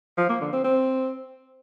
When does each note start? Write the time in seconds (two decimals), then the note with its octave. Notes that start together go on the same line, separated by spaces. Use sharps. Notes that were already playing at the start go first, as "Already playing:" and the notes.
0.18 F3
0.29 A#3
0.41 D3
0.53 C4
0.64 C4